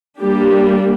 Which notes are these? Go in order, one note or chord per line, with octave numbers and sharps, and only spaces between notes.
G3 A#3 D4 G4